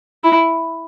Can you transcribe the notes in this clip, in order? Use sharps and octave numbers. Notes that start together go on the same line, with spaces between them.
E4